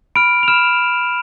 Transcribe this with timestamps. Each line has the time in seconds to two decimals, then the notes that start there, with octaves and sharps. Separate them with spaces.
0.15 B5 F6 D7
0.43 F7
0.48 B5 F6 E7